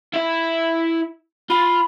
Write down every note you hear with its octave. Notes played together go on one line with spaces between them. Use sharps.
E4 E5
F4 B5